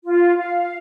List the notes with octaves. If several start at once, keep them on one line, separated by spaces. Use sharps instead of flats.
F4
F5